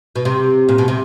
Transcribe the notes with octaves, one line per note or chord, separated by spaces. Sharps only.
B2
C3
A#2
B2
C3